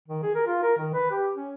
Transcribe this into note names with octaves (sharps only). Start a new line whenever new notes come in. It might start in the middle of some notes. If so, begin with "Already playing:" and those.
D#3
G#4
A#4
F4
A#4
D#3
B4
G4
C#4